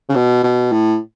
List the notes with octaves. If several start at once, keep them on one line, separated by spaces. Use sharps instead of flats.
C#3
B2
B2
A2